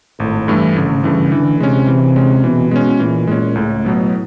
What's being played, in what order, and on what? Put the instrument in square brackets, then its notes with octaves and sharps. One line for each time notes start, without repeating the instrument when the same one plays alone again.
[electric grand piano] G#1 [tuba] A2
[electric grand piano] G2 E3 A3
[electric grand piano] G#1 [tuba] C#3
[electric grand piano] G2 E3 A3 [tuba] C#3
[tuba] D3 [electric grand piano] E3
[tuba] C3 [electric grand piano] G#3 C#4
[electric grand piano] E3
G#3 C#4
[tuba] B2 [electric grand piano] E3
[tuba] B2 [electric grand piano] G#3 C#4
[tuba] A#2 [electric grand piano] E3
[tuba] A#2 [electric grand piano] G#3 C#4
[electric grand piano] C#2 [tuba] A2
[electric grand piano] B2 F#3 B3